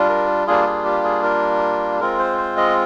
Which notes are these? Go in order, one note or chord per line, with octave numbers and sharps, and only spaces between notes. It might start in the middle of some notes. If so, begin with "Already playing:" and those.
Already playing: G3 D4 F4
A#4
G3 A#3 D4 F4 G#4
G#4
G4
G#4
A#4
G#3 C4 F4 A#4
C5
C5
D#5